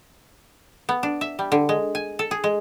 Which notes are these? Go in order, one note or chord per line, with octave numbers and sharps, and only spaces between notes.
B3
D4
E5
G3
D3
G#3
G#5
A4
G#4
G#3